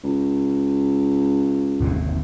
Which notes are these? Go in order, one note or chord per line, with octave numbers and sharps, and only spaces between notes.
C#2
G1 D#2 C3